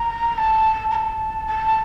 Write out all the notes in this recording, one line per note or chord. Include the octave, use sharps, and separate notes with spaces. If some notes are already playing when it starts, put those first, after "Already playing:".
Already playing: A#5
A#5
A5
A#5
A5
A5